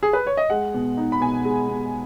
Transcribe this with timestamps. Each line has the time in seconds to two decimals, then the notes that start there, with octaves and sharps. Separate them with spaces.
0.03 G#4
0.13 B4
0.27 C#5
0.37 D#5
0.50 G#3 F#5
0.74 B2
0.97 D#4
1.12 B5
1.21 B2 G#5
1.45 G#3
1.69 B2